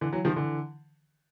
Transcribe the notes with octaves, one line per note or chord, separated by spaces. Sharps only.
D3 E3
E3 F#3
D#3 F3
D3 E3